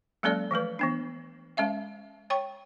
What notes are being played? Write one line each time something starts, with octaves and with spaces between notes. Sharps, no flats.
F#3 G#3 A#3 C#4 A4 D5
E3 F3 A3 B4
E3 B3 D4
G#3 C#4 E5 F5
C#5 G5 C#6